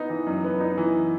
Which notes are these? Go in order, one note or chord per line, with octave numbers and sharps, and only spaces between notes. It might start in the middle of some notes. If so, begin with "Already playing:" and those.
Already playing: B3 D#4
E3
F#2
B3
D#4
E3